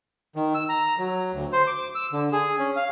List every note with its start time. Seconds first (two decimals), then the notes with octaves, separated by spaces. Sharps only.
0.36 D#3
0.54 E6
0.69 A#5
0.98 F#3
1.33 D2
1.53 C5
1.67 D6
1.95 E6
2.13 D3
2.32 G#4
2.59 C#4
2.76 F5